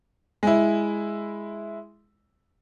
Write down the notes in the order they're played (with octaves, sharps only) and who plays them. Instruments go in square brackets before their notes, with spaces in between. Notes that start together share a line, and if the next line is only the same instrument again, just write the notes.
[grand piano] G#3 E4